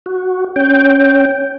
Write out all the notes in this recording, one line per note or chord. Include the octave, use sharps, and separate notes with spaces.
F#4
C#4 G5